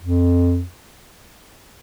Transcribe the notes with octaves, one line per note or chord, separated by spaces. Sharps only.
F2